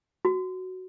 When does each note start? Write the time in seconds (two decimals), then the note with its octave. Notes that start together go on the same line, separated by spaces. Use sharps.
0.25 F#4